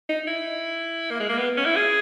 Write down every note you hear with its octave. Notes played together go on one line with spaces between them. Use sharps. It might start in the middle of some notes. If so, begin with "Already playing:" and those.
D#4
E4
A#3
G#3
A#3
B3
C#4
E4
G#4